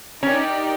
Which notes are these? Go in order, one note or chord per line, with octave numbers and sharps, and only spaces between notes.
C#4 D#4 G4 A#4 D5 G5